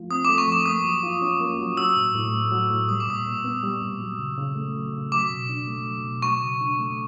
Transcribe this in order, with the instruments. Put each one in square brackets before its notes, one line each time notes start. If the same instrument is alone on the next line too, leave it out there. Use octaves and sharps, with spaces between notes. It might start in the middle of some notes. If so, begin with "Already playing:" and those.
Already playing: [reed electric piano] F3 A3 F4
[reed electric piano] C4 [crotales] D#6
[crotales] D6
[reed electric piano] A3
[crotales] C#6
[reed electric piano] F3 [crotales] D6
[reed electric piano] A#3 [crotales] D#6
[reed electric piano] F#3
F4
C#4
A#3
F#3
[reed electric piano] F#3 [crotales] E6
[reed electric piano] A2
A2
A3
F#3
A2
[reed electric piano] G3 [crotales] D#6
[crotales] D6
[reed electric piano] A#2 [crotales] D#6
[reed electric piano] A#2
B3
G3
A#2
F#3
C#3
C#3
A3
F#3
C#3
[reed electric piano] F#3 [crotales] D6
[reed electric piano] B2
D4
A3
F#3
B2
[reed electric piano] F#3 [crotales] C#6
[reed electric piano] C#3
D4
A3